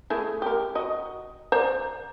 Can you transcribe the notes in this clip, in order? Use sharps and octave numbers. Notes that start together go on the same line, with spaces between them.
A3 E4 G#4
G4 A#4
F#4 D#5
C5 D5 A#5